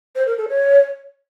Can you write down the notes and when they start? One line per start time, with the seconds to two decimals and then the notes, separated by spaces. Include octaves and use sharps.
0.16 C5
0.27 A#4
0.38 A4
0.48 C#5